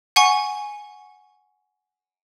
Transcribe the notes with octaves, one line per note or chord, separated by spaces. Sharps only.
F#5 G#5 C#6